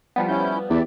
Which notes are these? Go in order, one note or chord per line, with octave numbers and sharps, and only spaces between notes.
F3 G3 B3
C#4 E4 G6
E2 G4 D5 E5